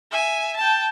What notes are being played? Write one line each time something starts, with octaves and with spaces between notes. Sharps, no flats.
E5 G#5
G5 A5